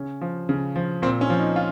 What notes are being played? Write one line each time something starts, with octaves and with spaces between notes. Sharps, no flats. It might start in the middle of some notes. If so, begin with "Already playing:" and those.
Already playing: C#3 C#4
F3
C#3
F3
A#2 C4
C#4
F3
D#4
F4